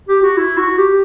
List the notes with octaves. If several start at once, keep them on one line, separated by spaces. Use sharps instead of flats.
G4
F#4
E4
F#4
G4